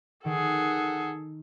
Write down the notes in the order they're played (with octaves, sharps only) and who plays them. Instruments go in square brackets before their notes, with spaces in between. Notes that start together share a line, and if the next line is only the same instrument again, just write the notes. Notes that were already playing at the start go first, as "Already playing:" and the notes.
[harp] D#3 [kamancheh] G#4 A4 [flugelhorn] F#5